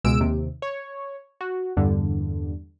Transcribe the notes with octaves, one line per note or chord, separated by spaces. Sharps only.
C#2 B2 G#3 E6 D7
D#2 C3
C#5
F#4
E2 G2 D3